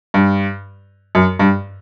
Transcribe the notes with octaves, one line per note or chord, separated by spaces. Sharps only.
G2
F#2
G2